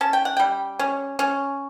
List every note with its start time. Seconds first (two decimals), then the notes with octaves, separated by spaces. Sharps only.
0.01 C#4 A5
0.13 G5
0.25 F#5
0.37 G3 G5
0.79 C#4
1.19 C#4